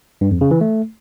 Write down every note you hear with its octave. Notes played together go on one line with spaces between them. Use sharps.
G2
F2
C#3
E3
A3